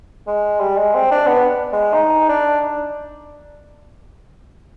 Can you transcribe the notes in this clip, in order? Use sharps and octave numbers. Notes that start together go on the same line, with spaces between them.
G#3
G3
G#3
C4
D4
B3
G#3
D#4
D4